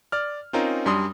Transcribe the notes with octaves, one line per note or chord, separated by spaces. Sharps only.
D5 F6
C4 C#4 D#4 F4 A#4
F#2 G3 D4 C6 D#6